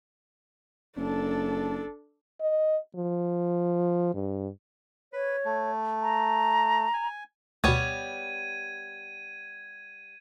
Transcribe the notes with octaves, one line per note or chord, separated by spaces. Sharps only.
F#1 D4 A4
D#5
F3
G2
B4 C#5
A3
A#5
G#5
D2 B2 G3 B3 C#5 G#6 D#7